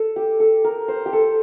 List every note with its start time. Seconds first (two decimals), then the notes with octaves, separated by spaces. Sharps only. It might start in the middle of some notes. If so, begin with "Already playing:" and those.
Already playing: A4
0.16 G4
0.40 A4
0.64 A#4
0.88 C5
1.06 G4
1.13 A4